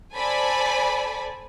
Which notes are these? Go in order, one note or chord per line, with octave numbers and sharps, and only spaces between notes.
A4 C5 D5 G#5 A5 B5